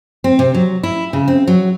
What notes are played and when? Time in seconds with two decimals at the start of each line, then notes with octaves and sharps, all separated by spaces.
0.24 C4
0.39 C3
0.54 F#3
0.83 E4
1.13 C#3
1.28 C4
1.48 F#3